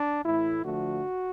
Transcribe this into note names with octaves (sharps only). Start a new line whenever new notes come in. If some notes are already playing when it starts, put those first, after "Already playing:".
Already playing: D4
A2 E3 A3 E4
D3 F3 A3 F#4